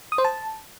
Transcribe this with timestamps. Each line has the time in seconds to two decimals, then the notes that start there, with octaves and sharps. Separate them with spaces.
0.12 D#6
0.18 C5
0.25 A5